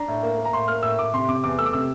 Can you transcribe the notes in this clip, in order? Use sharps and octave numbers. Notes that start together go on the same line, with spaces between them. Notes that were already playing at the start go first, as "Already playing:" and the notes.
Already playing: D4 A#5
A2
A#3
A#3
A#5
A2 C6
A#3 F6
A2 E6
A2 D6
C3 C6
C3 D6
E2 D6
A3 E6
D6
C3 E6